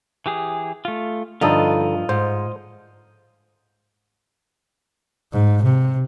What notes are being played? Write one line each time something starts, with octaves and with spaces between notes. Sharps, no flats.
E3 G4 G#4
A3 F4
G2 D3 F3 D#4 F4 A4 D#5
G#2 C5
G#2
C3